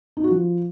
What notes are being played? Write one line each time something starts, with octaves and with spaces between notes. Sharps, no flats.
D#4
F#4
F3